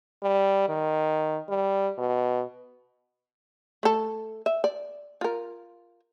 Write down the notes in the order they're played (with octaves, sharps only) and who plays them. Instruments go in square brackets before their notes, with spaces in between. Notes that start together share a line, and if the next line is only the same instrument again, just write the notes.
[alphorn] G3
D#3
G3
B2
[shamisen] A3 A4
E5
D5
F4 A#4